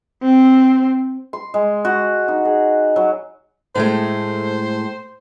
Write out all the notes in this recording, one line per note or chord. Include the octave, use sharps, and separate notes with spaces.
C4
C6
G#3
F#4
D#4
G#4
F#3
A2 G#3 A3 C5